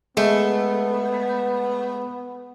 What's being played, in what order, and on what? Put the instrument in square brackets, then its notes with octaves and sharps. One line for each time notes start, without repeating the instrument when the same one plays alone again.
[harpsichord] G#3 [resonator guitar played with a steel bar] A3 [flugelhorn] B3